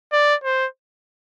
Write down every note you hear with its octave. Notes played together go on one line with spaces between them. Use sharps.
D5
C5